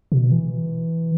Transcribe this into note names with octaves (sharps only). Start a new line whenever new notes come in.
B2
E3